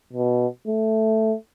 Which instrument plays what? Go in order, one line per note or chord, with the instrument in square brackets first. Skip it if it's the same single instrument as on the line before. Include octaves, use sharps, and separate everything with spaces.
[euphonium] B2
A3